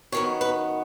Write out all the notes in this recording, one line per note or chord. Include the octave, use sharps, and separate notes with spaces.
F#2 D#3 B3 C#5
B4